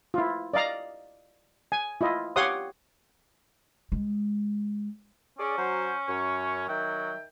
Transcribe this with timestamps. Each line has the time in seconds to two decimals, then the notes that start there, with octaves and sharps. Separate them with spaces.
0.14 E4 F4
0.54 D5 D#5 F5 A#5
1.72 G#5
2.01 E4 F4 D#5
2.36 G4 C#5 F5 F#5 C6 D#6
3.92 G#3
5.39 C#4 G#4 D5
5.57 F#3 C5
6.08 F#2 C#5
6.68 D#3 F#3 E5 G5